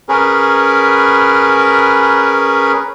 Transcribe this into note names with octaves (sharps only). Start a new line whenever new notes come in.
C#4 G#4 A#4 B4